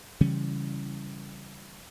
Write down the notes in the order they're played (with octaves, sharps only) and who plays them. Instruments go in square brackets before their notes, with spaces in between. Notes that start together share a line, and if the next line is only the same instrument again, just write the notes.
[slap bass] C#3 E3 G3 C#4